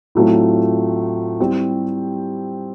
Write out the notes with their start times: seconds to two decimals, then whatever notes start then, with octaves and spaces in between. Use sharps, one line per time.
0.15 A2 F#3 A3 C4 F4
1.40 G3 C4 E4 G4